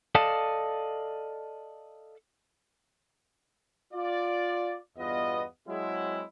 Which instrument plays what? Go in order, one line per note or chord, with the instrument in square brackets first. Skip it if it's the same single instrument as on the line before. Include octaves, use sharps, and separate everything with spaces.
[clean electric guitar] A4 D5 D#5 F5 A5
[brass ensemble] F4 D5
E2 G2 B3 F4 D#5
F#3 G#3 C4 E4